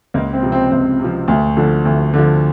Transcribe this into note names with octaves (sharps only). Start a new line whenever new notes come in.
C#2 A#3
C4
C3 F3
C4
C#2 C4
C3 F3
D2
D3 F3
D2
D3 F3